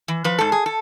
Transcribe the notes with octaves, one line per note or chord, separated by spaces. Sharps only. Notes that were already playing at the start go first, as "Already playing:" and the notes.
E3
F3 B4
G#2 A4
G#4
A4